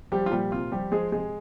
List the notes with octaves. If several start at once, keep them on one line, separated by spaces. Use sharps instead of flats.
F3 G3 G4
F4
A#2 G3 G4
C3 F4
F3 G3 G4
F3 G#3 G#4
C3 G#3 G#4